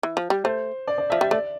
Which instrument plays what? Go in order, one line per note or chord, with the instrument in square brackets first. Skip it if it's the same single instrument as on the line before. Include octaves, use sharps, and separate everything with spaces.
[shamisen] E3
F3
G3
[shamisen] A3 [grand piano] C5
[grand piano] D5
D5
[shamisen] F3 [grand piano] E5
[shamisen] G3 [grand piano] E5
[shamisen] A3 [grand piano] D5